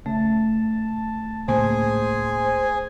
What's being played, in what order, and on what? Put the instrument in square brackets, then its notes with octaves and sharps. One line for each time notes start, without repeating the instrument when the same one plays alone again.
[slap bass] C#3 [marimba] A3 E5 [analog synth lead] A5
[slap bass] C#2 A2 A#3 [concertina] G#4 G#5 [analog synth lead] C5